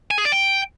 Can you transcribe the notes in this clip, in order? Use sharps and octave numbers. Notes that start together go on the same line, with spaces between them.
G#5
G#4
D5
G5